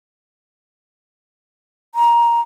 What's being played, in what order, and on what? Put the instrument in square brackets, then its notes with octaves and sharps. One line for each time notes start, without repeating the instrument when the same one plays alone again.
[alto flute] A#5